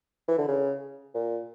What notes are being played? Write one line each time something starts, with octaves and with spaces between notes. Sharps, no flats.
E3
D3
C#3
A#2